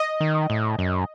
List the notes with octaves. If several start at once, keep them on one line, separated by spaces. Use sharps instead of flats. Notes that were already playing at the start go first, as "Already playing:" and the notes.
Already playing: D#5
D#3
A2
F#2